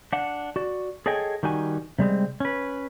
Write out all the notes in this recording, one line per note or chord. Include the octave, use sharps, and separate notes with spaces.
D4 F#5
F#4 D5
G#4 A4 C#5 D#5 G5 G#5
D#3 G3 D#4 F#4 G#5
C3 G3 G#3 C4
C#4 B4